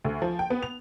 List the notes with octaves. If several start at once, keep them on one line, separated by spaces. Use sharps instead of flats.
D2
F3
G5
B3
F7